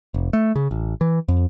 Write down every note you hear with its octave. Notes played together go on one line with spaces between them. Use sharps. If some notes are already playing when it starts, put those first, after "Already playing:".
F1
A3
C#3
A1
E3
F2